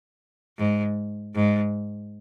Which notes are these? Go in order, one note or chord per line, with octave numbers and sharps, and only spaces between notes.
G#2
G#2